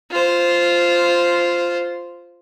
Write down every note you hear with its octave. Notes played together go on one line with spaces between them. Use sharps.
F4 C5